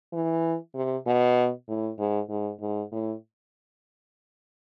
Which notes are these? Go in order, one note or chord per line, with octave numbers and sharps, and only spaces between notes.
E3
C3
B2
A2
G#2
G#2
G#2
A2